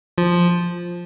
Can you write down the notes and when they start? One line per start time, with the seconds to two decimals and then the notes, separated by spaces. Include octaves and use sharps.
0.18 F3